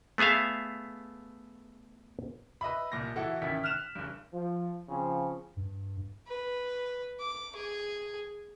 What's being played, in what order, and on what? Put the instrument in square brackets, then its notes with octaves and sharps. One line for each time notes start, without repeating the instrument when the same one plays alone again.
[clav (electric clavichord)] A3 B3 G#4 E5 F5
[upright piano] B4 D#5 E5 B5
C2 A#2 A#6
E3 E4 F#4 A4
A1 D#3 C#4 E4 B6
F6 F#6 E7 F7
F#1 G2
[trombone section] F3
C#3 F3 C4 C#4
[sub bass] G2
[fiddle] B4
D6
G#4